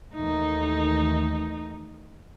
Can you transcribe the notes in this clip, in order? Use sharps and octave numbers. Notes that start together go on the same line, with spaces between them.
D#2 E3 A3 D#4